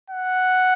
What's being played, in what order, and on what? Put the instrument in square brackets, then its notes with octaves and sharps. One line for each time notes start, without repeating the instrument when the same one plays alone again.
[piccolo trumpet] F#5